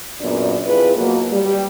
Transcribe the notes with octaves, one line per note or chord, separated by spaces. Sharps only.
F#2 A#2 C#3 B3 D4
F2 E4 F4 G#4 B4
B2 F#3 A#3
G3